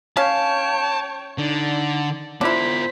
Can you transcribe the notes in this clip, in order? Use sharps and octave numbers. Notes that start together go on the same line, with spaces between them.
C#4 C#5 F5 G5 A5
D3 D#4 D5
B3 D4 E4 F4 C5 B6